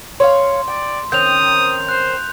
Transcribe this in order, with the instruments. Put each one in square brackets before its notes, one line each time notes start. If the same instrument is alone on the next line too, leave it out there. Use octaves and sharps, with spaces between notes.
[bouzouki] C#5 E5 F5 [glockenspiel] C6
[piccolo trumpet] D5 [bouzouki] G5
[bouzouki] D#3 C4 C#4 [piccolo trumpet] D#6 [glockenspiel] G6 F7
[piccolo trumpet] C5 [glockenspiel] F#6